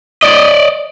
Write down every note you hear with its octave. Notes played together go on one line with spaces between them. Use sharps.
D5 D#5